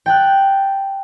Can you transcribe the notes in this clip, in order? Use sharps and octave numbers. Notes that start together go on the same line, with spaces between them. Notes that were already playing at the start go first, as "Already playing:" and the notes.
G5 A5 F#6